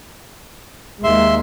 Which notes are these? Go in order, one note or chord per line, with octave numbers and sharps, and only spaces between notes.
D#2 G#3 A#3 E5 C6